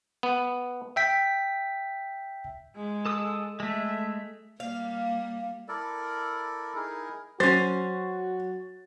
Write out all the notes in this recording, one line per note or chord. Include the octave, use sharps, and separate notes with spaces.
B3
E5 G5 B6
G#3
A4 D#6 E6
G#3 A3 E5
G3 A#3 F5
E4 A4 A#4 D5
D#4 E4 G#4 A#4
F#3 C#4 F#4 C5 A6